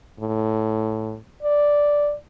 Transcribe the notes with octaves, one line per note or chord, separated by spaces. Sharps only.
A2
D5